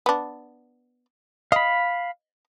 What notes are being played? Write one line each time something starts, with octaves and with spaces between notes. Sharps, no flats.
B3 D4
D#5 F5 B5